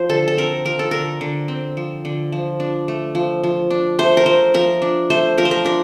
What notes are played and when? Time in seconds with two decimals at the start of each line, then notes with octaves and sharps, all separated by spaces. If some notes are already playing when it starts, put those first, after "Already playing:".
Already playing: F3 C5
0.09 D3 A4
0.28 A4
0.37 C4 A#4
0.65 F3 A#4
0.79 A4
0.91 D3 A#4
1.21 D3
1.48 C4
1.77 F3
2.05 D3
2.32 F3
2.60 D4
2.88 A3
3.15 F3
3.43 F3
3.70 D4
3.99 A3 C5
4.17 A#4
4.26 F3 C5
4.54 F3 A#4
4.82 D4
5.10 A3 C5
5.38 F3 A#4
5.45 C5
5.51 A#4
5.65 D4 A#4